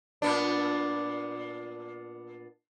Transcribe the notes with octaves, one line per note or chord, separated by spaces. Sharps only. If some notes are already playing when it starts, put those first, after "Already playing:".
A#2 B3 D4